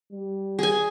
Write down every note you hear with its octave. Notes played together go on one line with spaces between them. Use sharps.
G3
G#4 G#5